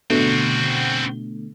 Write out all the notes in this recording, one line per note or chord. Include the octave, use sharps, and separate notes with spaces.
B2 D3 A3 C4 F#4